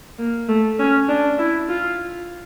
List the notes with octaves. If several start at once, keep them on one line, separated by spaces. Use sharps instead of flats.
A#3
A3
C#4
D4
E4
F4